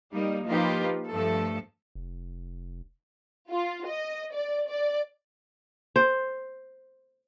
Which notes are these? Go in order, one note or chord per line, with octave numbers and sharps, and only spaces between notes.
G3 A#3 D#4
F3 A#3 D#4 F4 G4 B4
G2 F3 A3 A4
F1
F4
D#5
D5
D5
C5